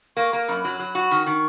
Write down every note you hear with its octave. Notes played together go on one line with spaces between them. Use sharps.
A#3 C#6
A#3 A#5
F#2 B5
F#3 B5
F#3
F#4
D#3 C#6
D#3